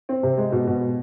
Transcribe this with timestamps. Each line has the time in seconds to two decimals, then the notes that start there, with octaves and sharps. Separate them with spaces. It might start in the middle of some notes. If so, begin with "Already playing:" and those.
0.09 C4
0.23 C3
0.37 G#3
0.52 B2
0.67 B2